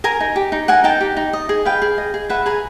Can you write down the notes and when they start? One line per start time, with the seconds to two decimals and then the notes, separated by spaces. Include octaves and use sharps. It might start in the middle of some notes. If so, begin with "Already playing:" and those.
0.04 A#4 G#5 A#5
0.20 D#4
0.36 G4
0.52 D#4
0.68 A#4 F#5 G#5
0.84 D#4 G5 A5
1.01 G4
1.17 D#4
1.33 D#5
1.49 G#4
1.65 B4 F5 G5
1.82 G#4
1.98 D#5
2.14 G#4
2.29 B4 E5 F#5
2.46 G#4 G#5 A#5